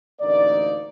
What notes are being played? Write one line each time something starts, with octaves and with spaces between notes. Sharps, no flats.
A1 D2 A#3 D#4 D5